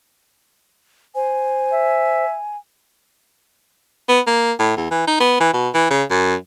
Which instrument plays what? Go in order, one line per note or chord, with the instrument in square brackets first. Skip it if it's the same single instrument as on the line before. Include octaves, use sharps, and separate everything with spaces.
[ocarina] C5 [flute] G#5
[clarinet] E5
[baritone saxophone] B3
A#3
A2
E2
E3
D#4
B3
E3
B2
E3
C#3
F#2